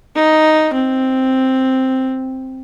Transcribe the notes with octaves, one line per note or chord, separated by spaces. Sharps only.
D#4
C4